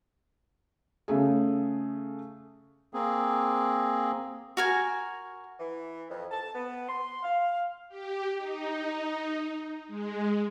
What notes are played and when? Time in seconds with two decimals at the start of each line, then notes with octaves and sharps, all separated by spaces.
1.08 C#3 A3 G#4
2.94 A#3 C4 G#4
4.57 F#4 A#4 G#5
5.59 E3
6.10 F2
6.31 A5
6.54 B3
6.89 C6
7.23 F5
7.89 G4
8.38 D#4
9.88 G#3